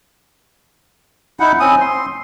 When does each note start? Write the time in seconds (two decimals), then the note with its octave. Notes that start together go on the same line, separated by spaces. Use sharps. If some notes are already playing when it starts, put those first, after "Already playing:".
1.40 D#4 E4 F#5
1.60 C4 C#4 D#6
1.80 C6